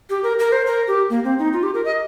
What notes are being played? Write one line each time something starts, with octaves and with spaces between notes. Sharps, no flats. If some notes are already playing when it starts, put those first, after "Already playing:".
G4
A#4
A#4
C5
A#4
G4
A#3
C4
D#4
F4
G4
A#4
D#5